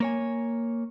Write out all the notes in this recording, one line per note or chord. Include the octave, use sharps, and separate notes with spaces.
A#3 C#5 G#5